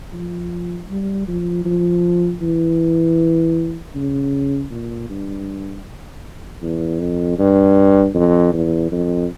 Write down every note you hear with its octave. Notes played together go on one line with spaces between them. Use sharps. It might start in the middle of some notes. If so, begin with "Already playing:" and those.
F3
G3
F3
F3
E3
C#3
A#2
G2
E2
F2
G2
F2
E2
F2